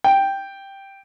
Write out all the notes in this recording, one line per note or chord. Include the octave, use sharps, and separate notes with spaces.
G5